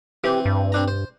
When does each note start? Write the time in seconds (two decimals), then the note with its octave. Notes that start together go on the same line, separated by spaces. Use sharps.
0.24 E3 C4 G4
0.45 G2
0.72 C4 D4 A#5
0.88 C5